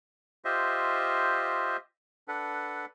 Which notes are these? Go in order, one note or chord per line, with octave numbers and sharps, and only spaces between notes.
F4 G4 C5 D#5 E5
D4 A4 B4 F#5